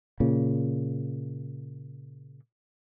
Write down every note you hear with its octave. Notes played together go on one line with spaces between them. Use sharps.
A#2 C#3